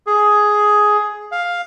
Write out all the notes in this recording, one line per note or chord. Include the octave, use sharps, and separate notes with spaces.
G#4
F5